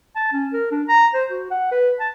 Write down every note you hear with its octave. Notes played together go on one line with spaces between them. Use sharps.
A5
C#4
A#4
D4
A#5
C5
F#4
F#5
B4
A5